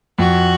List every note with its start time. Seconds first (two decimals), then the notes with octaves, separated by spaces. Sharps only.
0.19 F2 F#4